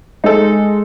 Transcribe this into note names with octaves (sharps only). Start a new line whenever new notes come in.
G#3 D#4 A4